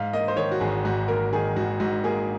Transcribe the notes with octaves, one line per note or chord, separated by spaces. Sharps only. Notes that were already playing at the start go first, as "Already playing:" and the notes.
Already playing: G#2 F5
A#3 D#5
C5
D#3 C#5
F#4
G#1 G#4
G#2 F#4
A#3 A#4
D#3 G#4
G#1 F#4
G#2 F#4
A#3 G#4